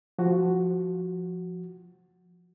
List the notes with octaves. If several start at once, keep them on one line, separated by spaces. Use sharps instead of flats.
F3 F#4